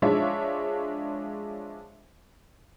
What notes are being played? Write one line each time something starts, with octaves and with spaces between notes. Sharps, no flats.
F3 G#3 D4 F4 C#5 E5